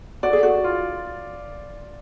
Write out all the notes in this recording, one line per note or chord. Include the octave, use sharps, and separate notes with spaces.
F#4 D5
G#4
F#4
F4